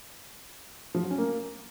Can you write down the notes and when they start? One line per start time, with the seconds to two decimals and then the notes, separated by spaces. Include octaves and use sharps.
0.95 F3
1.02 F#3
1.10 C#4
1.18 A#3